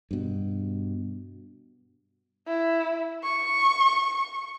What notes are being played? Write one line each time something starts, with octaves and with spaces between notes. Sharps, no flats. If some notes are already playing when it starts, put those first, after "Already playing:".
G2 B2
E4
C#6